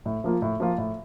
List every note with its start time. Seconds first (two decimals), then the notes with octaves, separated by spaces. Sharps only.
0.05 A2
0.24 F3 A#3 F4
0.42 A2
0.60 F3 A#3 F4
0.78 A2